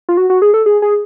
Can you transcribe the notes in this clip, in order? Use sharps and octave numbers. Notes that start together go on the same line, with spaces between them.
F4
F#4
F#4
G#4
A4
G#4
G#4